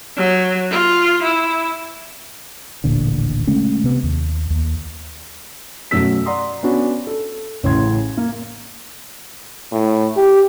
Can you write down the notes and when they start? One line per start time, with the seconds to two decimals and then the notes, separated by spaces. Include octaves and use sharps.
0.17 F#3
0.71 F4
1.23 E4
2.84 D#1 A1 A#2 D3
3.47 C#3 G#3 A3 C#4
3.84 C3 B3
4.03 D#2
4.50 D#2
5.91 F#2 B2 A3 A4 E6 B6
6.26 D5 F#5 A#5 C6 D#6
6.63 B3 C#4 D4 F#4
7.07 A4
7.63 A1 A2 C#3 C6 G#6
8.17 A#3
9.72 A2
10.17 G4